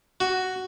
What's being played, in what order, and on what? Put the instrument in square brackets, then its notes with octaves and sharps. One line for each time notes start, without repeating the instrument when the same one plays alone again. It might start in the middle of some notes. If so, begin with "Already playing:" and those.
[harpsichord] F#4